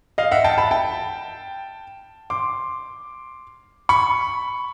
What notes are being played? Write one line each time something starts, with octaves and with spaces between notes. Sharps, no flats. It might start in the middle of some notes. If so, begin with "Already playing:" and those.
D#5 F5
E5 F#5
G5 A5
A5 B5
G5 A5
C6 D6
B5 C#6